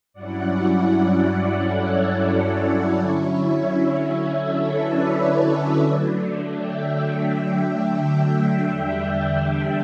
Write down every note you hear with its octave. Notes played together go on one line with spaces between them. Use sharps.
G2 F#3 C#4 E4 D5 F#5
A4 C#5
D5 F#5
D3 F#3 C#4 E4 C#5 E5
A4 C#5
B4 D5
D3 F#3 A3 D4
E5 G5
E5 G5
E2 D3 G3 D4
E5 G5